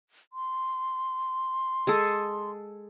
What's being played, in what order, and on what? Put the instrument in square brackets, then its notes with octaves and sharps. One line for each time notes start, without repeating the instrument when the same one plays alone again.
[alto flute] C6
[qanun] G#3 G#4 A4